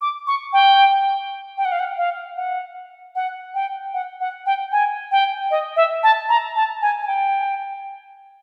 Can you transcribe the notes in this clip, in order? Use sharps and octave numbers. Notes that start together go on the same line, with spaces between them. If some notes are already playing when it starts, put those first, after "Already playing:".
D6
C#6
G5
G5
F#5
F5
F#5
F5
F#5
F#5
G5
F#5
F#5
G5
G#5
G5
D#5
E5
A5
A#5
A5
G#5
G#5
G5